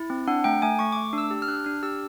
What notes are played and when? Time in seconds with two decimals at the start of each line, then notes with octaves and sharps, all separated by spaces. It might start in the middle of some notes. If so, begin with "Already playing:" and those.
Already playing: E4
0.10 C4
0.27 D4 F#5
0.44 A3 G5
0.62 A3 G#5
0.79 A3 C#6
0.92 D6
0.97 A3
1.13 D4 E6
1.31 G4
1.42 F6
1.48 D4 F#6
1.65 D4 F6
1.83 G4 E6